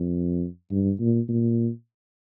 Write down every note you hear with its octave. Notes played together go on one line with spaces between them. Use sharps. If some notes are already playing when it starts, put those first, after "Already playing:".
Already playing: F2
G2
A#2
A#2